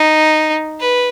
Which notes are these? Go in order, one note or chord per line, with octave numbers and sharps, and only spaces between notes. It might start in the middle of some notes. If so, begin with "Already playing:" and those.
Already playing: D#4
B4